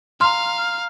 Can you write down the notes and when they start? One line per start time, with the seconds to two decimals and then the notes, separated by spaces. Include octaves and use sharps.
0.21 F5 A#5 C6 F6